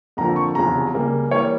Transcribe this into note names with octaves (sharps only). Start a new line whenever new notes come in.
F2 D3 F3 A#3 A#5
C#6
F1 E2 C#3 F3 A#5
C#2 C#3 G3 A#3
E3 G3 A#3 C#5